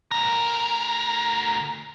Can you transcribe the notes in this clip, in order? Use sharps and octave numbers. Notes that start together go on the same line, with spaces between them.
D2 A#4